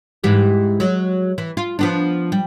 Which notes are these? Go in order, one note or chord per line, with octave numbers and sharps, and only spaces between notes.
G#2 E3 G4
F#3 G#3
E3
F4
F3 B3 D4
G3